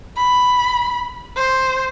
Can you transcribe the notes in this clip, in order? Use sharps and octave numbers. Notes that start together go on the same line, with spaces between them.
B5
C5